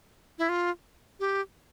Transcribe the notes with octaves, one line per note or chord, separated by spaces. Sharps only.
E4
F4
G4